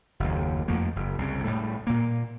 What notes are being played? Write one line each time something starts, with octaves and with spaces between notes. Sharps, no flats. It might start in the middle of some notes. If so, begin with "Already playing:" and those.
F#1 D#2
F2 F3 A3 A#3
F#1
C2 C#3
A2 G3
A#2 A#3